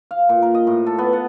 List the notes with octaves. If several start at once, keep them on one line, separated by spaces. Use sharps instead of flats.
F5
A#2
A#4
D#5
A2
A4
B3
F#5